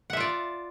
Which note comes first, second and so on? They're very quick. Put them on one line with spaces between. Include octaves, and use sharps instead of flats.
F#5 E5 F4 D5